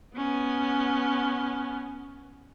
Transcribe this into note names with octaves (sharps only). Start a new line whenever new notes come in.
B3 C#4